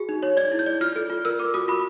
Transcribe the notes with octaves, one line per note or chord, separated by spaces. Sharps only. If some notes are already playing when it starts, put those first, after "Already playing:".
Already playing: F#4 G#4
D#4
C#5
D5 G#6
E4
G6
D5
F4 F6
A4
F4
A#4 E6
A#4 D6
F#4 D#6
F4 B5